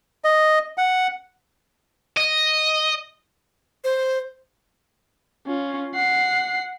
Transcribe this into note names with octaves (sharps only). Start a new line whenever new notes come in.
D#5
F#5
D#5
C5
C#4 F4
F#5 C7